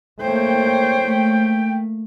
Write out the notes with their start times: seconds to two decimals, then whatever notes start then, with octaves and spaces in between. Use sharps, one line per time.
0.21 A3 A#3 C5 C#5 G5
1.03 A3 A#3